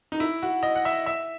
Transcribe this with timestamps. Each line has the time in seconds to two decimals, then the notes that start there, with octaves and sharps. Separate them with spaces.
0.12 D#4
0.20 E4
0.42 F#4
0.63 D#5
0.75 F#5
0.85 E5
1.06 E5